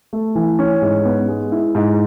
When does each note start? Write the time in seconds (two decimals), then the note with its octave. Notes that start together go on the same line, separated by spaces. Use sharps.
0.13 A3
0.35 E3
0.59 C#4
0.82 G#2
1.05 B3
1.28 G#3
1.52 E4
1.75 G#2